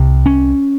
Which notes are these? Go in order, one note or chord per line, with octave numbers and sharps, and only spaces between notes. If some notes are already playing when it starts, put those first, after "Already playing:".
Already playing: C2 C3
C#4